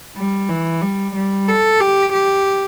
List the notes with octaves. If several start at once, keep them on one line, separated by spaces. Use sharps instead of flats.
G3
E3
G3
G3
A4
G4
G4